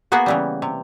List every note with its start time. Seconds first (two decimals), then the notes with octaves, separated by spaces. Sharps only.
0.12 A#3 B3 F#4 G#4 F#5
0.26 C#3 E3 G3
0.62 C3